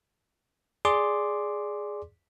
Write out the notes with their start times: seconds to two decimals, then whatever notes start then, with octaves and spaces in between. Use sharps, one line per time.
0.85 G#4 D5 C6 D6